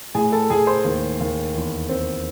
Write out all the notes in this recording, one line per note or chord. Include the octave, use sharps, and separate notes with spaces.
A2 G#4 G#5
A4 A5
A2 G#4 G#5
C5 C6
D#2
D#2
E2
C4